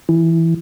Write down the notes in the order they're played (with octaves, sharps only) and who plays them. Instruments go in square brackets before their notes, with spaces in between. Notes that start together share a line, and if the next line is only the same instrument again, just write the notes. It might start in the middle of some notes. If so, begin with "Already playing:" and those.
[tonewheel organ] E3